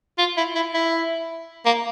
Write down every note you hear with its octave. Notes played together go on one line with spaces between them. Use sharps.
F4
E4
E4
E4
A#3